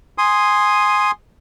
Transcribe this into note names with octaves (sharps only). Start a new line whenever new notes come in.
G#5 C6 D#6